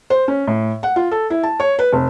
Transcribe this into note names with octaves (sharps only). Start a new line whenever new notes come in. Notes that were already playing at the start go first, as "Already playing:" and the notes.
C5
C#4
A2
F#5
F4
A4
E4
A5
C#5
B4
F1